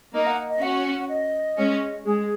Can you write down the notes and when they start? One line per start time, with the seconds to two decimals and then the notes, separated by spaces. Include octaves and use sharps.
0.14 A#3 D#4 D#5
0.27 F#5
0.50 D#5
0.62 C#4 F#4 F#5
1.09 D#5
1.58 G#3 C#4
2.05 G#3 G#4